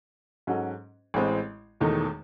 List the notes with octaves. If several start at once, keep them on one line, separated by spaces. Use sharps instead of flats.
G#2 F#3 C#4 F#4 A4
A1 A2 G#3 C4
E1 E2 D#3 A3 D#4